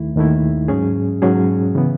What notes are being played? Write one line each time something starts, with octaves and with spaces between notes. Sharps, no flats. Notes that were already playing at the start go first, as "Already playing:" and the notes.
Already playing: D#2 D#3 A3 E4
D#2 D#3 A3 E4
G#2 F#3 C#4 G#4
G#2 F#3 C#4 G#4
C#3 E3 B3